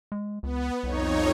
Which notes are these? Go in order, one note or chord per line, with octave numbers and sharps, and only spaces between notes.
G#3
C#2 B3
C2 F2 D#4 C#5